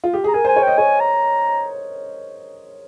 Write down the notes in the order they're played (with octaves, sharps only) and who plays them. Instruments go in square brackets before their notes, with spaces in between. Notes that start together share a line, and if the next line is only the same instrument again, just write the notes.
[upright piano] F4
G4
[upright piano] G#4 [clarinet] A#5
[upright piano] A#4 [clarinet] G#5
[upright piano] C5 [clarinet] G#5
[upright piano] C#5
[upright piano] D#5 [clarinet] G5
[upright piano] C#5 [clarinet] G#5
[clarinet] A#5